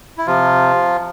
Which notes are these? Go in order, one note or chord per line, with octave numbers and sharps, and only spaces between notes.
E4
C3 F3 F4